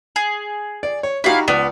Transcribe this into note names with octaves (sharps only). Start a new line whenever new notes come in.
G#4
D5
C#5
D#4 E4 F#4 G4 F5
C#2 B3 D5